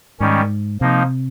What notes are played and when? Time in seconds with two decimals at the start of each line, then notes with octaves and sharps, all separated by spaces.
0.20 G#2 D#3 G3 C#4
0.81 C3 F3 A#3 D#4